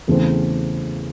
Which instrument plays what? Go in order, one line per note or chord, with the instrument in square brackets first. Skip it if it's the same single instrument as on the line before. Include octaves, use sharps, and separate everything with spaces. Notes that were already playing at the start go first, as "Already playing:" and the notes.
[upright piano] E2 C#3 E3 A3 C4